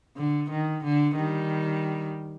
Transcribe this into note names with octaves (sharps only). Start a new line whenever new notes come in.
D3
D#3
D3
D#3 G3